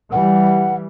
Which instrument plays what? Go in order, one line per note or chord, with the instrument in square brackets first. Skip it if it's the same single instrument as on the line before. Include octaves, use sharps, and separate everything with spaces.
[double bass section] E3 G3 [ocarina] F#5